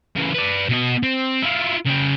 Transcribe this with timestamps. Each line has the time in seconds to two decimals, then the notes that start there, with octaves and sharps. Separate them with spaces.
0.16 C#3 E3
0.34 B4 D5
0.69 B2 D#5
1.03 C4
1.42 E4 F4
1.85 C#3 G5